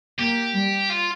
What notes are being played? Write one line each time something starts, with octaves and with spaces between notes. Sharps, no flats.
A#3 G4
G3
F4